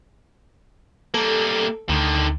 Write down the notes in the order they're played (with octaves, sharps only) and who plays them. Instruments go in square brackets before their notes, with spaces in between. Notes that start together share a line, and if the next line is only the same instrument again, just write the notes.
[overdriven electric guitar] G3 A#3 [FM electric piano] A4
[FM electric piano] D2 [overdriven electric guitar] D3 D#3